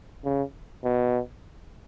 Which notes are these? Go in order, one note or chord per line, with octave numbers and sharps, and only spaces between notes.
C#3
B2